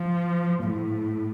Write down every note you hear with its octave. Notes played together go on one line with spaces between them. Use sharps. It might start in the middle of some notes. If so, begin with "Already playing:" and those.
Already playing: F3
A2